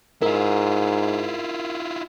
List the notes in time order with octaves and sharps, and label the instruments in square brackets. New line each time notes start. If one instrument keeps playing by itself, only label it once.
[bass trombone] G#2 [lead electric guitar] E4 F4 [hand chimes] A#4